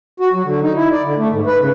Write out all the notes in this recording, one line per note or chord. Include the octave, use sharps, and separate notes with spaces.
F#4
F#3
D3
D#4
E4
D5
D3
A3
G#2
B4
C#3